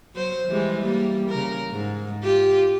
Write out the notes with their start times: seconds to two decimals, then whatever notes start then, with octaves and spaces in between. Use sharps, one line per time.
0.14 F#3 C5
0.48 E3 G3 G#3
0.80 G3 A#3
1.30 C#3 A#4
1.70 G#2
2.24 F4 G4